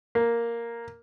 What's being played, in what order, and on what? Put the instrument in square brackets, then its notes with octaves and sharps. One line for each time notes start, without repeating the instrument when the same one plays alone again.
[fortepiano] A#3